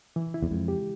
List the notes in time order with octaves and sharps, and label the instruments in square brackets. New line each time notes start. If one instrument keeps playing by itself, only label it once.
[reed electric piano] E3
E4
[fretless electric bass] E2
[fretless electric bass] F2 [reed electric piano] G#3
[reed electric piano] G4